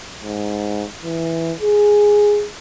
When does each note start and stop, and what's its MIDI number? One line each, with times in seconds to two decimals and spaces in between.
0.24 0.86 44
1.03 1.53 52
1.61 2.46 68